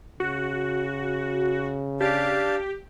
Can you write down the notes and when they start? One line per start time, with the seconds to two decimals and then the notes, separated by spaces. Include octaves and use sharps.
0.20 C#3 F#4
2.01 D4 G4 F5 A5